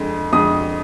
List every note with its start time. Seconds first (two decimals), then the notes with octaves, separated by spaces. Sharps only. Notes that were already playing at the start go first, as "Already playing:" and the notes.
Already playing: F2 D3 G#3
0.32 F2 D3 G#3 D#6